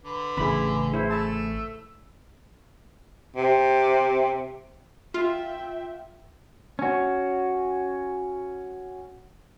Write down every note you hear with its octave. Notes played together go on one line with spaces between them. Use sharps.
D3 B4
A1 C#3 E4 G#4 B5
E4 C5
A3 A5 E6
C3
F4 E5 G5
C#4 F#4